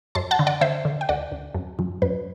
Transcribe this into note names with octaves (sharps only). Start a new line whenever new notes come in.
F#2 A5 C6
F#5 A5
D3
D5 F#5
D3 C5 E5
D3
G5
D2 D5 F#5
D2
F#2
F#2
F#2 B4